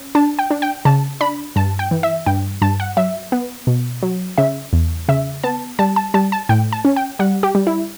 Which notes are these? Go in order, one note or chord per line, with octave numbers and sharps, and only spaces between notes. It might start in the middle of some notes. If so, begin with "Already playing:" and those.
Already playing: C#4
D4 A5
G5
D4
G5
C#3 A5
D4 B5
G2 A5
G5
E3
E5
G2 G5
G2 A5
F#5
F#3 E5
B3
B2
F#3
C#3 E5
E2
C#3 E5
B3 A5
G3 A5
A5
G3 A5
A5
A2 G5
A5
C#4
G5
G3 F#5
G4
G3
E4